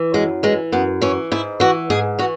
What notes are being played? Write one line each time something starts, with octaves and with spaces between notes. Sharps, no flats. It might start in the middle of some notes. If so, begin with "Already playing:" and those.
Already playing: E3
F#2 G#3
E3 G#3
F#2 B3
E3 C#4
G#2 E4
E3 F#4
G#2 G#4
E3 F#4